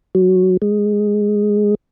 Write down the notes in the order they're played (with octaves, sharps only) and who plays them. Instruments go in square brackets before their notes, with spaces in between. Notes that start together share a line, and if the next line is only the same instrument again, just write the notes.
[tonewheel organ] F#3
G#3